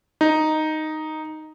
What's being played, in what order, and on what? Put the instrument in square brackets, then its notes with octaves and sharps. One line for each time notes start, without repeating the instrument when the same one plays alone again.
[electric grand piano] D#4